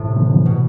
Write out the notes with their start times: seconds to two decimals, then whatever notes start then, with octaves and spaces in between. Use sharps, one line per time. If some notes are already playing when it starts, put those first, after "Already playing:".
Already playing: A2 C3
0.16 D3
0.31 E3
0.46 B2